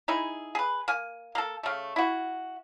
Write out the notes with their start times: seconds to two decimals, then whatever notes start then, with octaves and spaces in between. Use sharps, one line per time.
0.08 D#4 E4 G#4
0.55 G#4 B4
0.88 A#3 G#5
1.35 A#3 A4
1.63 C#3 A3
1.96 E4 F#4